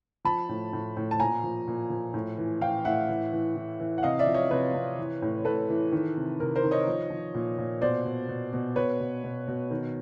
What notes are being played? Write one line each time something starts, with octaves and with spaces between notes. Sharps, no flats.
F3 A5 B5
A2
A2
A2
A5
A#2 G#5 A#5
F3
A#2
F3
A2
E3
E3 F5 G5
A2 E5 F#5
E3
E3
E3
E3
F#5
C3 D#5 F5
D5 E5
F3
C#5 D#5
C3 B4 C#5
C3
E3
A2
A2 A4 B4
E3
D#3
C3
C3 A#4
A#4 C5
D#3
C#5 D#5
F3
F3
A#2
A#2
B2 C5 D5
B2
B2
B2
B2 B4 C#5
B2
B2
B2
D#3